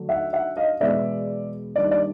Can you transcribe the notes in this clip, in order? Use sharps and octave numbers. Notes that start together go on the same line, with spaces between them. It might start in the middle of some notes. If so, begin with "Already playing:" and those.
Already playing: D3 F#3 A3 D4
E5 F#5
E5 F#5
D#5 F5
E2 B2 G#3 B3 D5 E5
D#3 G3 A#3 D4 D5
D5